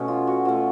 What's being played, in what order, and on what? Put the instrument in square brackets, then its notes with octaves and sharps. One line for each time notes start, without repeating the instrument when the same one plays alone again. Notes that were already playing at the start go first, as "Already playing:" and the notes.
Already playing: [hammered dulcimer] B2 A3 C#4
F4
F#4
B2 A3 F4